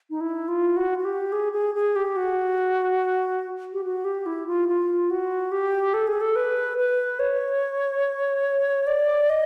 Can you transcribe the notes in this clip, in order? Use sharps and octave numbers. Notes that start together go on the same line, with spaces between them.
D#4
E4
F4
F#4
F#4
G4
G#4
G#4
G#4
G4
F#4
G4
F#4
G4
E4
F4
F4
F#4
G4
A4
G#4
A4
B4
B4
C#5
D5
D#5